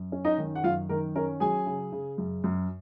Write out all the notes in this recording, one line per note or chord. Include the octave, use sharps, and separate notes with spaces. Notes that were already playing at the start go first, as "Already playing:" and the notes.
Already playing: F#2
C#4
D#4 D#5
D#3
F#5
F#2 F4 F5
D#3 A#4
C#4 A#4
F#3 G#4 G#5
C#3
C#3
F#2
F#2